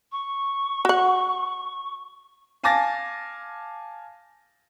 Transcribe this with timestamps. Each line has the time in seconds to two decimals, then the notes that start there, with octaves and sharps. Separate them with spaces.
0.12 C#6
0.85 F#4 F#5
2.64 F5 G#5 A5 D6 A6 A#6